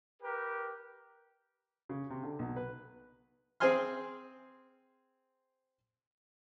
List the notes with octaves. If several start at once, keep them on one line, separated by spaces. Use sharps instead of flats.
G4 A#4 B4
C#3
C3
D3
B1
B4
C4 G#4 C5 G#5 C6 F6